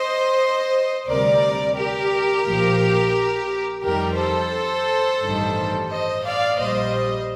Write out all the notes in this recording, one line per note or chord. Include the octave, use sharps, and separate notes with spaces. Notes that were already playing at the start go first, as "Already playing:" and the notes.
Already playing: C5 D#5
D2 C3 G3 A#4 D5
G4 A#4
A#1 A#2 F3
F2 D#3 G3 G4 A#4
A4 C5
A1 G2 D#3 G3
C5 D#5
D5 F5
A#1 A#2 G3 C5 D#5